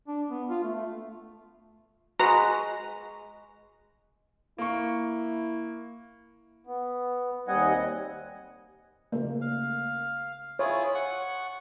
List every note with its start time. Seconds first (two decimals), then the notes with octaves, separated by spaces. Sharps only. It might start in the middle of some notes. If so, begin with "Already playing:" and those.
0.08 D4
0.30 B3
0.49 F4
0.63 A3
0.75 A3
2.20 G#3 F#4 B4 A#5
4.58 A#3 E4 C#6
6.67 B3
7.48 D#2 G3 C4 D#5 F#5 G#5
9.12 C#3 A3 A#3
9.41 F5
10.59 E4 F4 G#4 C#5
10.95 F#5 C#6